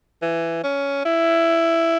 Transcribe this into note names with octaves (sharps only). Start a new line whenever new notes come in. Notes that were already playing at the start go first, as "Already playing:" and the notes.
E3
C#4
E4